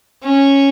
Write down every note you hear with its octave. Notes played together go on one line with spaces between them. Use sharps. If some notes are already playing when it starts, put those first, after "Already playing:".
C#4